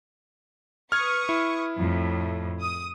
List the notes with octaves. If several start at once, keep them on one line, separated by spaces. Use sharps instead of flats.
B4 C#6 D#6 F6 G#6
E4
F2 A2
D#6